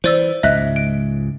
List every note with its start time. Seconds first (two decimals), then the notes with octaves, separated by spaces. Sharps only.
0.04 E3 C5 D5 E6
0.43 C#2 G#2 D#5 E5 F#6
0.76 D7